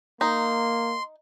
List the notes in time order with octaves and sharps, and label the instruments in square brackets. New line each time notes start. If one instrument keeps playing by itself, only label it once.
[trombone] A#3 [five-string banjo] D#4 [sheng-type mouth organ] C6